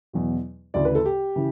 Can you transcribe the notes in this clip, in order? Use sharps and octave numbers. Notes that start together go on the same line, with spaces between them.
E2 B2 F#3
D2 C#3 E3 D5
B4
A4
G4
C#3 E3